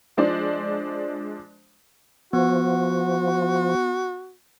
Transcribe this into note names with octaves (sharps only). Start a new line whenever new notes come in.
F3 G#3 D4 C5 D5
F3 B3 F#4